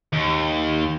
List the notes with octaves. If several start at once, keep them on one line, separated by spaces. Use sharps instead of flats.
D#2